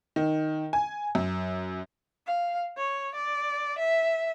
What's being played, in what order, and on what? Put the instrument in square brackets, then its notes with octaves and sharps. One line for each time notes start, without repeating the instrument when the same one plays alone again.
[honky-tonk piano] D#3
G#5
F#2
[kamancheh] F5
C#5
D5
E5